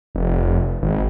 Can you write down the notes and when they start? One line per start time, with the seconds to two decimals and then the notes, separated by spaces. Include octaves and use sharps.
0.15 F1
0.82 G#1